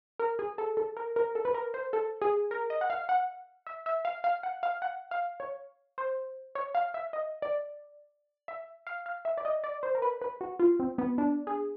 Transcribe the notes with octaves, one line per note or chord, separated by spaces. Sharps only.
A#4
G#4
A4
A4
A#4
A#4
A4
B4
A#4
C5
A4
G#4
A#4
D#5
F#5
F5
F#5
E5
E5
F5
F5
F#5
F5
F#5
F5
C#5
C5
C#5
F5
E5
D#5
D5
E5
F5
F5
E5
D5
D#5
D5
C5
A#4
B4
B4
F#4
F4
C4
B3
D4
G#4